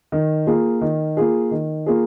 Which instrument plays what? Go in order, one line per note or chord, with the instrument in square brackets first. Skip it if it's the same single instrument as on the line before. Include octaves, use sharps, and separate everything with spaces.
[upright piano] D#3
A#3 F4 G#4
D#3
A#3 F4 G#4
D#3
A#3 F4 G#4